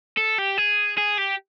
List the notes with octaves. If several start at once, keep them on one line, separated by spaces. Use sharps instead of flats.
A4
G4
G#4
G#4
G4